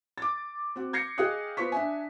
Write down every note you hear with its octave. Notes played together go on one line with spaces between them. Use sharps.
D6 A6
C4 F#4
G6 G#6 A#6 C7 C#7
G#4 D#5 F5 G5 D#6 F#6
B3 F4 C5 C#6 B6
D4 E5 G#5